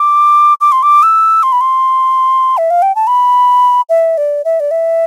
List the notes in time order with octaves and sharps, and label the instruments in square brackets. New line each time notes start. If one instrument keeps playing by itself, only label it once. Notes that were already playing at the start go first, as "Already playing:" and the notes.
Already playing: [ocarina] D6
D6
C6
D6
E6
C6
B5
C6
E5
F5
G5
A5
B5
E5
D5
E5
D5
E5